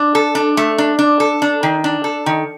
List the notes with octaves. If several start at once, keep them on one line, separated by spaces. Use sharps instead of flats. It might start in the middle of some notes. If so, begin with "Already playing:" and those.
Already playing: D4
A4
D4
A3
D4
D4
A4
D4
D#3
D4
A4
D#3